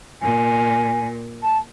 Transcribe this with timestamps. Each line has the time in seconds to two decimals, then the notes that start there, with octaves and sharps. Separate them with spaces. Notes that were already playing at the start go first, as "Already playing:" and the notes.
0.21 A#2 G#5
1.42 A5